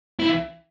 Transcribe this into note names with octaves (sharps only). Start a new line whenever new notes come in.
E4